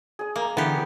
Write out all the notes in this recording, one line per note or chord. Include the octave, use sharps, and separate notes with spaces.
G#4 D#5
A#3 A#5 D6
D3 E3 B3 G4